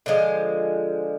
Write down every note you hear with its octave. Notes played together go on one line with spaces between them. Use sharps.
D3 F3 G#3